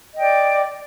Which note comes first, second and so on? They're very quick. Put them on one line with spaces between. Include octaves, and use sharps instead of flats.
D#5 G5 D5